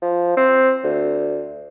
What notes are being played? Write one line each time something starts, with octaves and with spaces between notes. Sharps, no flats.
F3
C4
D2